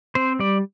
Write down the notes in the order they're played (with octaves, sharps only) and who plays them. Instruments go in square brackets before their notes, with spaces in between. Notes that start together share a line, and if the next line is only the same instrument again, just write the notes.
[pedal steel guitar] C4 C5
G3 D5